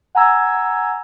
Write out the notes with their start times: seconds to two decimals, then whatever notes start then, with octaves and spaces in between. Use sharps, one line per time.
0.15 F#5 G#5 A#5 E6 G#6